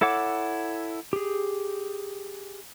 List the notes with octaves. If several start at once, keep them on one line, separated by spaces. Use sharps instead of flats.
E4 A4 C#5 F#5 D6
G4 G#4